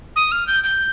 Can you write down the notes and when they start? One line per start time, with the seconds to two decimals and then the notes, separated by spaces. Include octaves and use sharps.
0.16 D#6
0.32 F6
0.47 G6
0.64 G6